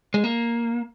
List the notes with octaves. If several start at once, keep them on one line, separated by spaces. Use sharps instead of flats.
G#3
A#3